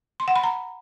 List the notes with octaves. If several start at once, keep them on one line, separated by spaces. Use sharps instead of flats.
C6
F#5
B5
A#5